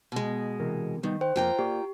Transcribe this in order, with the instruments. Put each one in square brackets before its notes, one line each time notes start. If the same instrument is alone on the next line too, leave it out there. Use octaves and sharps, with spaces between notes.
[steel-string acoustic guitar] B2 G#3
[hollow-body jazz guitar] C3 E3 A#4
[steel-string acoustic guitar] D#3 [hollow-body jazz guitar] G3 B3 D#4
[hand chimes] C5 [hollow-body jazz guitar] G5
[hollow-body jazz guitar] F2 A#3 [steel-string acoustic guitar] F4 G5 A#5
[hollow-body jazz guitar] A#3 D5 [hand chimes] G4